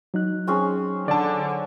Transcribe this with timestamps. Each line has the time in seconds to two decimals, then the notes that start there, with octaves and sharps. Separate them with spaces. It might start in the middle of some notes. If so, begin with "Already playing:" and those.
0.14 F#3 D#4 F#6
0.47 C4 C#4 G#4
1.08 D3 D5 A5